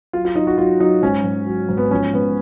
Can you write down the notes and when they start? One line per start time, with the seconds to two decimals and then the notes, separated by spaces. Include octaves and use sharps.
0.13 F#3 F4
0.25 F4
0.35 F#3 D#4
0.47 F#4
0.58 F#3 F4
0.80 F#3 D#4
1.02 G#2 C#4
1.24 G#2
1.47 F#3
1.69 G#2
1.77 B3
1.91 F3 C#4
2.13 G#2 B3